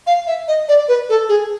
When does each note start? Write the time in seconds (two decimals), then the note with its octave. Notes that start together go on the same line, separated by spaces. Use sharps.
0.07 F5
0.27 E5
0.48 D#5
0.69 D5
0.88 B4
1.09 A4
1.29 G#4